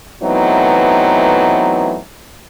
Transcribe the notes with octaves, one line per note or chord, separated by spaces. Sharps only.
E3 F#3 A3 B3 C4 D#4